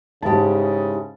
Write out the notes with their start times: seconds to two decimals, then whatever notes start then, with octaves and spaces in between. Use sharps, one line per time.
0.23 G#2 C#3 E4 G4 A5